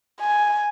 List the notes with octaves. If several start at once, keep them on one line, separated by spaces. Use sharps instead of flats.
G#5